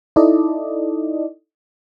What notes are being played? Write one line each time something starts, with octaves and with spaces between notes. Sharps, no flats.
D#4 E4 A4 D5 D#5